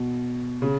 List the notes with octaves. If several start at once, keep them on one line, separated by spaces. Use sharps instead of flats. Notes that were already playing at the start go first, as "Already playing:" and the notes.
Already playing: B2
C#3